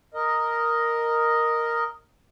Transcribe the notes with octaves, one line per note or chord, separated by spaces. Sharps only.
A#4 D#5